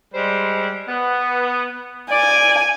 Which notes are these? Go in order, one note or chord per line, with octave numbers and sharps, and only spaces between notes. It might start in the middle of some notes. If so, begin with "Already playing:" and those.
G3 G#3 C5
B3
D5 G#5